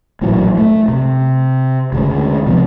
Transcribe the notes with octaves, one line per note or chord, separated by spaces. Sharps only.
A1 A#2 E3 F#3
A3
C3
D2 C#3 G#3
C3 F3 B3